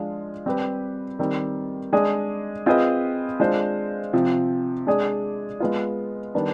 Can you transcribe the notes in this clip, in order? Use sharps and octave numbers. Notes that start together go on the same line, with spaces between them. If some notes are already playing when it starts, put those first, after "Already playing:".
Already playing: F3 G#3 D4 F4 G#4
G3 C4 G4 B4
D#3 G3 C4
G#3 D4 G#4 D5
C4 F4 G#4 B4 D#5
G#3 D4 F4 C5
C3 F3 C4
G#3 D4 G#4 D5
G#3 B3 F4
D#3 G3 B3 D4